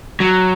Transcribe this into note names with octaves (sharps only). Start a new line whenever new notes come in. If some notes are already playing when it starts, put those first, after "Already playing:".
F#3